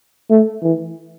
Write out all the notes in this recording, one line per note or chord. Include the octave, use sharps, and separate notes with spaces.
A3
E3